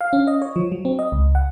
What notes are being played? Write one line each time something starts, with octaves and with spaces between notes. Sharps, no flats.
F5
C#4
D#5
C#5
F3
F#3
C4
D#5
C#2
F#5